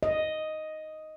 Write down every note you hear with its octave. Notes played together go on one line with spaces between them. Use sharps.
D#5